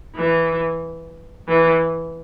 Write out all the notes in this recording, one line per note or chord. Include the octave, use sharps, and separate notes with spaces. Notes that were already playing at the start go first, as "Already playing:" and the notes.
E3
E3